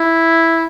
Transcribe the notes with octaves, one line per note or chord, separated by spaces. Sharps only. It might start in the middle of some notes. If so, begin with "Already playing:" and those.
Already playing: E4